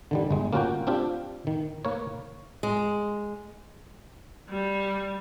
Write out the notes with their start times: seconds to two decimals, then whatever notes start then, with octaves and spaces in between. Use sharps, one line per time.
0.11 D3 D#3 G3
0.31 G1 G#3
0.53 A#3 C#4 F4 F#4 A#4 G5
0.87 C4 D4 F4 G4
1.47 D#3
1.85 A#3 A#4 B4 C#5
2.63 G#3
4.49 G3